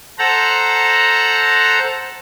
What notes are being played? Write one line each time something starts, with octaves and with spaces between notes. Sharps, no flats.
A4 C5 F#5 A#5